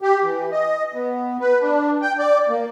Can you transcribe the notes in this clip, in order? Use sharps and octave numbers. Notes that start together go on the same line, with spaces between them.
G4
E3
D#5
B3
B4
D4
G5
D5
A#3